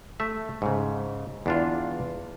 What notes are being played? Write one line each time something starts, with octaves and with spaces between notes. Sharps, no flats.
A3 E5
G#2 C#3
E2 D4 F4